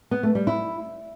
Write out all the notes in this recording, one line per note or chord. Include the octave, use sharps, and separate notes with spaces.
B3
A3
G3
E4